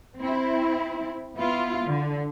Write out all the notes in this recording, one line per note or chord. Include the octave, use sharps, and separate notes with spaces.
C4 E4
B3 E4 F4
D3